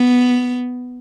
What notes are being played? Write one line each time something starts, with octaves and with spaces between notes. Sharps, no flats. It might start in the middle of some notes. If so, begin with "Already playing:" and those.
Already playing: B3